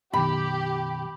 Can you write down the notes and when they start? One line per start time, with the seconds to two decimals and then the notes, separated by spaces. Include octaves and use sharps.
0.13 F#2 B2 D#3 G4 B5